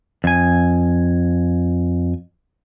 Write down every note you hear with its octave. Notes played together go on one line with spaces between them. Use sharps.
F2 G#5